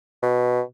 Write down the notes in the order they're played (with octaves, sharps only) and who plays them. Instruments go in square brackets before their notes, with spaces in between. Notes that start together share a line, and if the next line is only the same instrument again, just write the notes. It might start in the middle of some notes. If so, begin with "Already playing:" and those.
[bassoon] B2